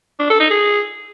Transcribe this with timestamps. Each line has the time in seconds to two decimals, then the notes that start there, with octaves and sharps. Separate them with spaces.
0.19 D4
0.30 A4
0.40 D#4
0.51 G#4